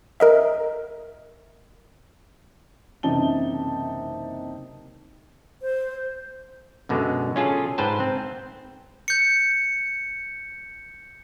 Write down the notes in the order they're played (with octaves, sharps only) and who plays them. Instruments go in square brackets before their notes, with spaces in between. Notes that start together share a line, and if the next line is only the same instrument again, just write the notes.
[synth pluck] A#4 D#5 E5
[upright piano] F#1 C3 E3 D#4 A5 G7
[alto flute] C5
[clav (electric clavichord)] F#2 B2 D3 G#3
C#4 F4 G#4 A4
G#2 B4 C5 G5 A5
C4
[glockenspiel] G6 C#7